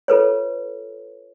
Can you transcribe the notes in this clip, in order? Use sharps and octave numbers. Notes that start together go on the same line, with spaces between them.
F4 A4 B4 C#5